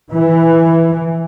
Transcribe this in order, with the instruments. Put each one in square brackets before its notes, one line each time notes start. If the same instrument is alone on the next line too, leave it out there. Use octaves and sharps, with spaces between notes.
[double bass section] E3